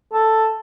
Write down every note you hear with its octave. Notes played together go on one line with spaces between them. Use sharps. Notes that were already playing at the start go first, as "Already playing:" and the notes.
A4